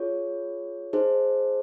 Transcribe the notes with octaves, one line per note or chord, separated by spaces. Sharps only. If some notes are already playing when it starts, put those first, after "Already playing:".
Already playing: F4 G#4 C#5
D#4 G#4 C5